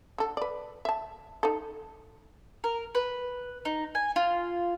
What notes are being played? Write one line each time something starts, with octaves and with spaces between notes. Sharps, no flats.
D3 A4
B4 D5
E5 A5
D#4 A4
A#4
B4
D#4
G#5
F4